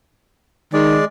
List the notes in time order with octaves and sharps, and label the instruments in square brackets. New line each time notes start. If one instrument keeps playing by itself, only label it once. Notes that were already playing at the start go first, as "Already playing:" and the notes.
[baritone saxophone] D#3 [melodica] G#3 D5